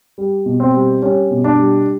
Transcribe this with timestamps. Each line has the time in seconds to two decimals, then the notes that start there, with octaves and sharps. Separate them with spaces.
0.18 G3
0.46 B2
0.60 C4
0.74 G3
1.02 G3 C#4
1.31 B2
1.44 D4
1.59 G3